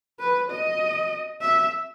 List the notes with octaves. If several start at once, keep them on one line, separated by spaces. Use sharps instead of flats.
B4
D#5
E5